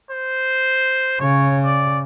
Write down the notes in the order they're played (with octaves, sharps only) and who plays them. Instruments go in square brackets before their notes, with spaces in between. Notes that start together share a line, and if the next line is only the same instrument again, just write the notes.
[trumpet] C5
[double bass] C#3 [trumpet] C#5
[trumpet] D5